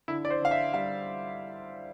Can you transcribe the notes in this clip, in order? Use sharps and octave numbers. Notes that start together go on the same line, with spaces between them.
D3 E4
D5
C5
D3 F5
E5
G3 F5